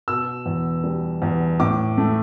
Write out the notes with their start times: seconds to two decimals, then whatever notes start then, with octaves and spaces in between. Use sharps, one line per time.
0.08 B2 E6
0.46 E2
0.84 G3
1.22 E2
1.60 A2 D6
1.98 A3